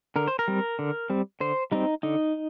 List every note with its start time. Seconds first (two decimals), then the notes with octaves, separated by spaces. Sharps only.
0.16 D3 A#4
0.28 C5
0.39 A#4
0.48 G3 C4
0.79 D3
1.10 G3 C4
1.40 D3 C5
1.72 G3 C4 D#4
2.03 D3 D#4